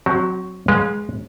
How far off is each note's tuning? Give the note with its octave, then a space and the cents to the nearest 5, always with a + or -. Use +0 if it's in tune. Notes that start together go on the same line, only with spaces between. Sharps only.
F#3 +0 C4 +0 F#4 +45
G#3 +0 B4 -40 F5 +20